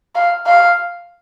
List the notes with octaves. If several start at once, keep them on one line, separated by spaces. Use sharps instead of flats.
F5
F5